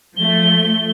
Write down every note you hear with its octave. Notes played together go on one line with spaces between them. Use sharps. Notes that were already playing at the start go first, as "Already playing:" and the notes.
F3 A3 G7